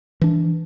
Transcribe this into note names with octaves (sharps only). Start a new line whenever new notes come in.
E3 D4